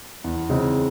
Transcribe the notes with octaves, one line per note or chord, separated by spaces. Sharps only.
E2
C#3 G#3 C4 D#4